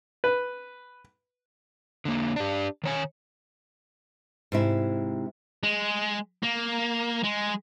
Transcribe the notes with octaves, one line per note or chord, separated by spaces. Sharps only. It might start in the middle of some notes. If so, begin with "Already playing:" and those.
B4
D3 A#3
D4 G4
D#3 C#5 G#5
G#2 C3 E4
G#3
A#3
G#3